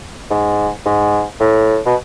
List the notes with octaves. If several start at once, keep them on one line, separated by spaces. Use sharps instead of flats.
G#2
G#2
A2
B2